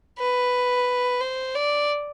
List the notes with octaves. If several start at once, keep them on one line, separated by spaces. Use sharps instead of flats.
B4
C5
D5